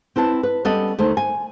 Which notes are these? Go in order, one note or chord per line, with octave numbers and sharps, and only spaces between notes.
C4 E4 B4 A5
B4
G3 B3 C#4 A4 D5 D#5
D2 D#3 A3 C5
G#5